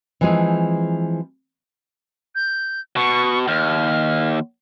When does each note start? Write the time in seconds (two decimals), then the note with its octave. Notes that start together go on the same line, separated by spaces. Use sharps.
0.21 E3 F3 G#3 C4 G#4
2.35 G6
2.96 B2 C#6
3.48 D#2 F6